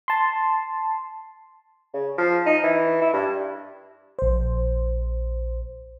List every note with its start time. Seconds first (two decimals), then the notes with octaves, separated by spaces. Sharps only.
0.08 A5 C6
1.94 C#3
2.18 F3
2.46 D#4
2.64 E3
3.02 E4
3.13 G2
4.19 A#1 C5